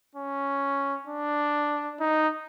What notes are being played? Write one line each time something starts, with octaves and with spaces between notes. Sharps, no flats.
C#4
D4
D#4